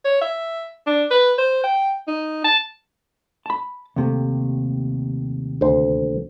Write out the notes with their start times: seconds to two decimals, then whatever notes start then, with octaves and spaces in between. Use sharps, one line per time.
0.05 C#5
0.21 E5
0.87 D4
1.11 B4
1.38 C5
1.64 G5
2.07 D#4
2.44 A5
3.46 A5 B5
3.96 D#2 C3 A3
5.61 D2 C5